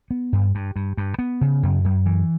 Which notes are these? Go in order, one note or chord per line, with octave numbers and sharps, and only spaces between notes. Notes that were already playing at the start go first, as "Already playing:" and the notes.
B3
G2
G2
G2
G2
B3
C#3
F#2
F#2
E3